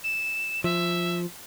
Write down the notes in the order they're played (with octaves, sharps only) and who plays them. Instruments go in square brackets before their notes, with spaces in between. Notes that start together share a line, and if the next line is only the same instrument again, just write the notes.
[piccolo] E7
[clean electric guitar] F3 [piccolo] E5